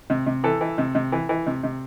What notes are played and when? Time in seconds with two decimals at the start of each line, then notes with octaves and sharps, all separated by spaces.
0.10 C3
0.26 C3
0.44 E3 A4
0.61 E3
0.78 C3
0.95 C3
1.12 E3
1.29 E3
1.46 C3
1.63 C3